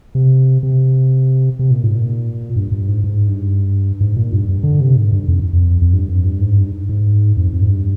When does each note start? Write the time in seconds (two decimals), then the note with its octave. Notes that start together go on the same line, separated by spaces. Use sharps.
0.15 C3
0.63 C3
1.59 C3
1.71 A#2
1.83 G#2
1.95 A#2
2.56 G2
2.72 G2
2.88 G#2
3.04 G#2
3.27 G2
4.01 G#2
4.17 A#2
4.33 G2
4.49 G2
4.64 D3
4.81 C3
4.96 G#2
5.13 G2
5.28 F2
5.53 F2
5.82 F2
5.93 G2
6.08 F2
6.25 G2
6.41 G#2
6.57 G2
6.89 G#2
7.37 F2
7.53 F2
7.62 G#2
7.69 G2